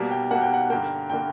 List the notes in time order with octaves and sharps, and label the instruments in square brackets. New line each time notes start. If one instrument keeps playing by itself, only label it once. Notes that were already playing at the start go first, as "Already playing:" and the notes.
Already playing: [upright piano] B2 G3 A#3
G5
B2 G3 A#3 F#5
G5
F#5
G2 D3 A#3 G5
D3 A#3 G5